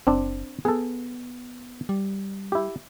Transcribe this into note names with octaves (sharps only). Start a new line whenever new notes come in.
F#1 C4 D4
B3 G#4 A4
G3
E4 G4